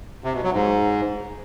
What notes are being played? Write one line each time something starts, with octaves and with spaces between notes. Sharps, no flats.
C3
B2
F#3
G#2